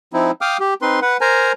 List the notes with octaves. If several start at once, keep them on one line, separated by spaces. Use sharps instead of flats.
F3 C4 D#4 E4
F5 G5 D6 D#6 F6
G4
C4 D#4 B4 C6
B4 F#5
A#4 C5 G#5 A#5